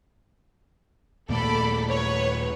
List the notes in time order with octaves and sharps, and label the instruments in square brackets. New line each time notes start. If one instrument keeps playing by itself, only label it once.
[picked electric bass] D#2 A#2 A3 [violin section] A4 D5 B5
[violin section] B4 C#5